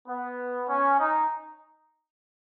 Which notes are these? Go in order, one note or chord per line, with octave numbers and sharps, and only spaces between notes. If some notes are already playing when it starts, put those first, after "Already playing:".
B3
C#4
D#4